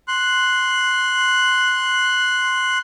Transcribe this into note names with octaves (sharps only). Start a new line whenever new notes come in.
C6 F#6